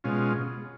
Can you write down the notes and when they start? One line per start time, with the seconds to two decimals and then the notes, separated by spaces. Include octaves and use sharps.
0.04 B2 G#3 C#4 F4